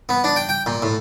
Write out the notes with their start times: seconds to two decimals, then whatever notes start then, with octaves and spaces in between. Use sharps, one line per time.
0.09 B3
0.24 D4
0.36 G5
0.49 G5
0.66 A#2
0.83 A2